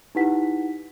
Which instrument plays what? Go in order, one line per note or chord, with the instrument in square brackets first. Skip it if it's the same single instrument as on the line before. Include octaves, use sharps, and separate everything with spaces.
[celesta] D#4 E4 G4 B4 F#5 B6